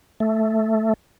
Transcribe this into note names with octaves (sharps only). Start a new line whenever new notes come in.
A3